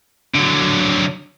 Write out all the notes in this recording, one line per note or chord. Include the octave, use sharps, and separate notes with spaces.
D3 F#3